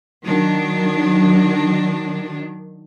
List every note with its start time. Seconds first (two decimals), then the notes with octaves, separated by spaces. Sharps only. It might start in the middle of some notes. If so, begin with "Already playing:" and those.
0.23 D#3 F#3 D4